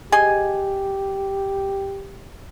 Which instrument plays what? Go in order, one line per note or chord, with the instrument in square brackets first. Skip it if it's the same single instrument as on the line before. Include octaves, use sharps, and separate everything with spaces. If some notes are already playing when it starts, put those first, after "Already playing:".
[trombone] G4 [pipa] G#4 D#5 G#5